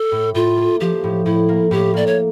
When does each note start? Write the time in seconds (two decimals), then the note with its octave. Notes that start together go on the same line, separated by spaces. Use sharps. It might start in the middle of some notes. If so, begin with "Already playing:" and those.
Already playing: A4
0.12 A2
0.34 A2 F4
0.57 A#3
0.80 F3 G4
1.04 A2
1.26 A2 E4
1.49 A#3
1.71 A2 G4
1.94 A#3 D5
2.07 C#5